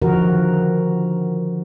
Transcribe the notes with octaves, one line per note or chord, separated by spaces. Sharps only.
D3 D#3 F3 F#4 A#4